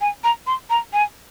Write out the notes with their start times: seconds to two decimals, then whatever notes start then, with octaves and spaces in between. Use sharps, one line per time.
0.01 G#5
0.24 A#5
0.47 C6
0.70 A#5
0.93 G#5